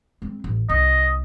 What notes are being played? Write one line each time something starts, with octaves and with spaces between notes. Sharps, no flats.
G#3 C4
A1
C2 D#5